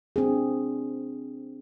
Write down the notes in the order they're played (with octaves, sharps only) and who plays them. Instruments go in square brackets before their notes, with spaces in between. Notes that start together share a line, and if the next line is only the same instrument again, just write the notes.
[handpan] C4 D4 G#4